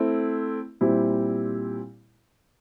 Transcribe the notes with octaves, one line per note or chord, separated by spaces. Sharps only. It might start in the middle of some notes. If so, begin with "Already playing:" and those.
Already playing: A3 C4 E4
A#2 G3 C4 E4 G4